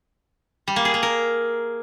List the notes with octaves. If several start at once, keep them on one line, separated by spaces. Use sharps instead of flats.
G3
A#3
G#4
A#3
A#4